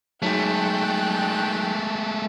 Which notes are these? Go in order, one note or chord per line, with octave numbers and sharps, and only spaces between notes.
F#3 G#3 A3 D#4 G#4 G5 A5 F#6